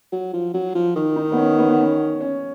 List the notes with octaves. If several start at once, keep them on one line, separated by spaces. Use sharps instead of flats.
F#3
F3
F#3
F3
D#3
D#4
B3
C#4
B3
B3
C#4
C#4